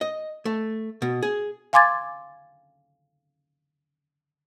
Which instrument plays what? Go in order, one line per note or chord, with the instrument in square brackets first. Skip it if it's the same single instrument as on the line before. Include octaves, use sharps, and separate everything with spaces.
[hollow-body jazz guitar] D#5
A3
B2
G#4
[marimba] F5 G#5 C6 D6 G#6 A6